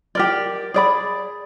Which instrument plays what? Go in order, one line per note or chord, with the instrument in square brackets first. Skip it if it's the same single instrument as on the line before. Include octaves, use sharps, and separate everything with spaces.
[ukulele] G4 A#4 D5
G#4 D5 B5